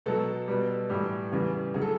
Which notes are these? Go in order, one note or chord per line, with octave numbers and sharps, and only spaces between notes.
B2 F#3 A4
B2 G3
A2 E3 G3
E2 C#3 E3 G3
C#3 F#3 G#4
A4